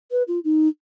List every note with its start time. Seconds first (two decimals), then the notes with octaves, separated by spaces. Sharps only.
0.11 B4
0.28 F4
0.44 D#4